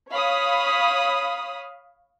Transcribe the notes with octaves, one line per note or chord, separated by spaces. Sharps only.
C#5 F5 B5 D#6